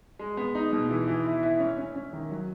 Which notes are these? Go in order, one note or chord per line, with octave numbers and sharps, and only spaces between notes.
G#3
B3
D#4
B2
E3
E3
E4
E4
C#4
C#4
C#4
D#3
F#3